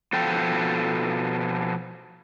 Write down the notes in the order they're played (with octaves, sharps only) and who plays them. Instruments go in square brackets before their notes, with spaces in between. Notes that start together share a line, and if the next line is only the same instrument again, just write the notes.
[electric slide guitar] B2 F3 A4 G5